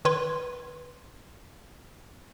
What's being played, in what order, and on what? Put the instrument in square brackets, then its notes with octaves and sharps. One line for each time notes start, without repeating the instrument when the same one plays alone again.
[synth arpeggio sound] D#3 B4 C#5 C6